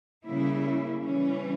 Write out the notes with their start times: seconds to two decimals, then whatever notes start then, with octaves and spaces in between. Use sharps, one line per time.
0.25 C#3 G3 A#3 E4
1.04 E3 G3 C#4